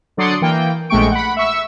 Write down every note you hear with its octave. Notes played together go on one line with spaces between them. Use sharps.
D3 F#3 D5 C6 D#6 C#7
E3 A#3 G5
A#1 G#3 A3 G5 C#6 D7
F#5 B5
E5 C#6 E6